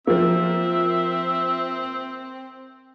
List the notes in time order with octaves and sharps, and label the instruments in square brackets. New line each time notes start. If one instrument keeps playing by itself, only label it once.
[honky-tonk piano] F3 A#3 [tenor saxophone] C4 [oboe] E5